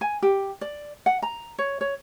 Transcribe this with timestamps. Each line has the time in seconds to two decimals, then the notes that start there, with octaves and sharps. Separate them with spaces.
0.01 G#5
0.22 G4
0.61 D5
1.06 F#5
1.22 A#5
1.58 C#5
1.81 C#5